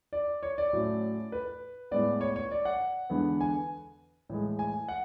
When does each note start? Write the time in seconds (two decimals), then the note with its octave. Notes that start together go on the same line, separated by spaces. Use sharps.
0.13 D5
0.43 C#5
0.58 D5
0.73 A2 F#3 A3 C#4
1.32 B4
1.91 A2 G#3 B3 D5
2.21 C#5
2.36 C#5
2.51 D5
2.65 F#5
3.10 E2 D3 G#3 B3
3.41 G#5
4.29 A2 E3 G#3
4.59 G#5
4.88 F#5